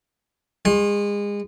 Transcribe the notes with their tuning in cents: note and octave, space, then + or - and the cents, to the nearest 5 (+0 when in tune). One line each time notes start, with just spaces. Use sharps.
G#3 -30 C6 +35